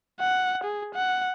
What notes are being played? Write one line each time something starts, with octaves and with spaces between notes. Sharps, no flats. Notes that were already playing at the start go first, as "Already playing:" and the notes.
F#5
G#4
F#5